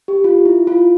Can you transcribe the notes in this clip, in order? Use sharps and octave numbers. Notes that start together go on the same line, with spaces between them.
G4
F4
E4
F4